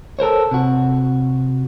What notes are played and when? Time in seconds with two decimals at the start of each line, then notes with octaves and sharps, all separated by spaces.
0.19 A4 A#4 C5 C#5
0.51 C3 F#4